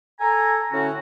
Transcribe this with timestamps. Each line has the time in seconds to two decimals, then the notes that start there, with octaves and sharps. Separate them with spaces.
0.20 A4 G#5 A#5
0.72 A2 D3 C#4 F#4